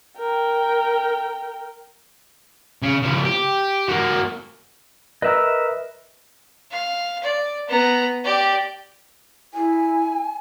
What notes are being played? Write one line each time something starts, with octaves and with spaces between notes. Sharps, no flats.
A#4 G5
C#3
C#3 F3
G4
A#3 F#4
A#4 B4 D#5 E5 E6
F5
D5
B3 A#5
G4 D5
E4 G#5